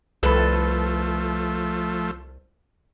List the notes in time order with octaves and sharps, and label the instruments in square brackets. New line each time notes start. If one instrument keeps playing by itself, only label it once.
[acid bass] C2 [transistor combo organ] F3 A3 [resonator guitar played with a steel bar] A4 B4